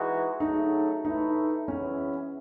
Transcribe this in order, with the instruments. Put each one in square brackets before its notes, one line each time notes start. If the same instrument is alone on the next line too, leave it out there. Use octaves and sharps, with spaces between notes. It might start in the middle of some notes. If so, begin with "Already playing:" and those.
Already playing: [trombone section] E3 G#3 D#4 F#4
[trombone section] C#3 F#3 A3 [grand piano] D#4
[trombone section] A2 E3 A3 E4 [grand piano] D#4
[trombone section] E3 G#3 B3 E4 [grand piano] C#4